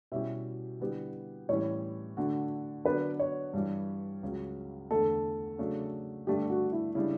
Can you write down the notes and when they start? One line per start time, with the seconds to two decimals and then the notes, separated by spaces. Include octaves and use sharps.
0.12 B2 G3 C#4 E4 G4 E5
0.80 D3 G3 B3 E4 G4
1.49 A2 E3 G3 C#4 E4 C#5
2.17 D3 A3 D4 F#4
2.85 D3 F#3 B3 D4 B4
3.19 C#5
3.53 G2 E3 G3 D4 G4
4.23 C#2 C#3 F#3
4.91 E2 D3 A3 A4
5.58 C#3 F#3 A3 D4
6.27 G2 D3 A3 D4 G4
6.50 F#4
6.73 E4
6.95 C#3 G3 D4 E4